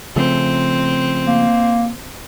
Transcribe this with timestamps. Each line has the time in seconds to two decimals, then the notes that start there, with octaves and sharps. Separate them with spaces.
0.16 C#3 F3 A3 C4
1.26 A#3